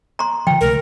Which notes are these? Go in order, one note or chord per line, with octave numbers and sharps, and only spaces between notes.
A#5 C6
D3 F3 G5
C#2 C3 A3 A#4